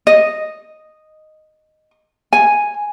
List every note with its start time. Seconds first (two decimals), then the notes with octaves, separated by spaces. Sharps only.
0.07 D#5
2.33 G#5